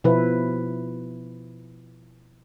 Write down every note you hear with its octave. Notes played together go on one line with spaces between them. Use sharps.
B2 F3 E4 B4